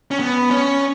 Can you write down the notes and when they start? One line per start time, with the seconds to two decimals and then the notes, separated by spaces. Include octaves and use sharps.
0.11 C#4
0.20 B3
0.51 C#4